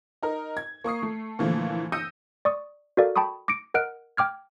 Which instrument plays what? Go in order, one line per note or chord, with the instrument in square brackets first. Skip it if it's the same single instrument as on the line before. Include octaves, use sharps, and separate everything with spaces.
[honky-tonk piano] D#4 A#4
G#6
A#3 C#6 D#6 C7
A3
A#2 D3 E3 F3 A3
D#6 E6 G6 A#6 C#7 D#7
[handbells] D5 C#6 D#6
F#4 A4 A#4 D5 F5
G5 A5 B5 C#6 D#6
D6 A#6 C#7 D7
A#4 D#5 F#5 F6 F#6 D7
G5 D6 F6 G#6